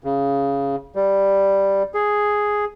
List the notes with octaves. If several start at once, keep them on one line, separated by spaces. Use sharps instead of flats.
C#3
G3
G#4